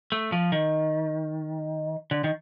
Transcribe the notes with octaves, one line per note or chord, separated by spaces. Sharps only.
A3
F3
D#3
D3
D#3